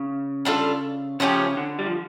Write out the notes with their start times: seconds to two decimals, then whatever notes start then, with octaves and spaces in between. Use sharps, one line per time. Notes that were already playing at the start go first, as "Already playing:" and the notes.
Already playing: C#3
0.45 G3 D4 F4 A4
1.20 C#3 F3 A3 C#4 G4
1.57 D3
1.79 G3
1.87 F3